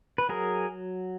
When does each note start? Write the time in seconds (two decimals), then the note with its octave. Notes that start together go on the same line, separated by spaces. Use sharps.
0.18 B4
0.29 F#3 G#4 A#4